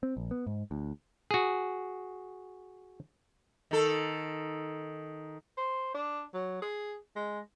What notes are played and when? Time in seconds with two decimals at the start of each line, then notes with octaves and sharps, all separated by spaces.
0.03 C4
0.17 A#1
0.31 B3
0.47 G#2
0.71 D2
1.31 F#4 G#4
3.71 D#3 A4
5.57 C5
5.94 D4
6.34 F#3
6.62 G#4
7.16 G#3